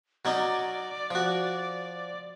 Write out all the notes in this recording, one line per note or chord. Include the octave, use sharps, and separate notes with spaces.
F#3 C#4 D#4 D5
F3 F#4